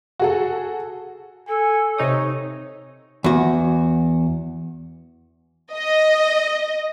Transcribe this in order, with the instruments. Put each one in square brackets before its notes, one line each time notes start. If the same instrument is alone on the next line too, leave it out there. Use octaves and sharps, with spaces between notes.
[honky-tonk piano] F#4 G#4 A4
[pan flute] A4 [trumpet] G#5
[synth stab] C3 D#4 D#6 [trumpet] C#5
[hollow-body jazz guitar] E2 F#4
[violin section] D#5